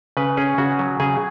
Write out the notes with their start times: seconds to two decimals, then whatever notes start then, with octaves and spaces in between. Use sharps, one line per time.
0.17 C#3 B4
0.37 C#4 G#4
0.58 C#3 F#4
0.79 F#3
1.00 C#3 G#4